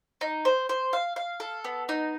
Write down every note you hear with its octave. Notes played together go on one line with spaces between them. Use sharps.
D#4
C5
C5
F5
F5
A4
B3
D#4